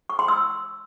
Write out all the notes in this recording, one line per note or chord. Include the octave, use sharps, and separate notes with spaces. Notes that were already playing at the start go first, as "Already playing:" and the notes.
C#6
C6
E6